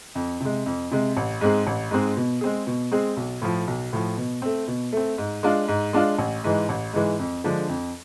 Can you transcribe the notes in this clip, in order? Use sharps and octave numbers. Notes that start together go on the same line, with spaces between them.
F2
C3 G#3
F2
C3 G#3
A1
G#2 G#3 C4 G#4
A1
G#2 G#3 C4 G#4
B2
G#3 C4 G#4
B2
G#3 C4 G#4
B1
A2 F3
B1
A2 F3
B2
A3 C4
B2
A3 C4
G#2
G#3 D4 F4
G#2
G#3 D4 F4
A1
G#2 E3 G#3
A1
G#2 E3 G#3
F2
D3 F3 G#3 D4
F2